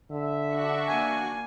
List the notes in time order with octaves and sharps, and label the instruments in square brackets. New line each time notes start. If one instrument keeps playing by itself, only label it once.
[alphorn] D3 [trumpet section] E5
[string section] D4 F#4 C#6
[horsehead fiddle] A#3 G#5